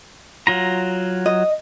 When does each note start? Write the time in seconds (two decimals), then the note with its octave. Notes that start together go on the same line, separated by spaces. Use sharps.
0.47 F#3 F4 A#5
1.26 D#5